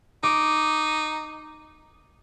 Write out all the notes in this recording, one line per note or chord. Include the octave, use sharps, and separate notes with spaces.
D#4 D6